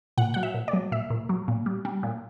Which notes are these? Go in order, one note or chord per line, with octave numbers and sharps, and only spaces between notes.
A#2 F#5
F#3 F#5
E5
A#2
D5
F#3
A#2 E5
A#2
F#3
A#2
G3
G3
A#2